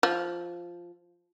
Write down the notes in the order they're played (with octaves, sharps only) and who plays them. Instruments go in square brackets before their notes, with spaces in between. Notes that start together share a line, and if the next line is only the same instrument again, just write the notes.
[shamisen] F3